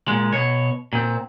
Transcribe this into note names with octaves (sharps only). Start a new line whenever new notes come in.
A#2 G#3
B2 C#5
A#2 C4